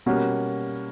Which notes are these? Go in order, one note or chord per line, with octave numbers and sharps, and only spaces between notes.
B2 G3 A#3 C#4 F#4